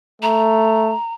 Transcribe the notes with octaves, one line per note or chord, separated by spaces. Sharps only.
A3 A#5